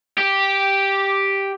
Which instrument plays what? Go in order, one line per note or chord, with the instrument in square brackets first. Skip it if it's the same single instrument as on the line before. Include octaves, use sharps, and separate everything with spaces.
[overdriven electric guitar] G4